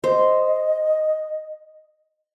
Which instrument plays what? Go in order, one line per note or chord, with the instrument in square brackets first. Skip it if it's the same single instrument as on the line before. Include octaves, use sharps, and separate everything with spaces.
[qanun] C5 [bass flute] D#5